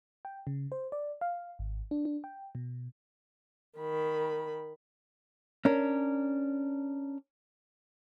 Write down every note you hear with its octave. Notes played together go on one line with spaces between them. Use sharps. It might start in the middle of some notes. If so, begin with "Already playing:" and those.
G5
C#3
C5
D5
F5
G#1
D4
D4
G5
B2
D#3 B5
C#4 D4 A#4